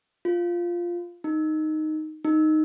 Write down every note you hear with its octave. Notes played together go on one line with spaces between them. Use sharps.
F4
D#4
D#4